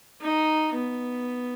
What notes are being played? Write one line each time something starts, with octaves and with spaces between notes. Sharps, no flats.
D#4
B3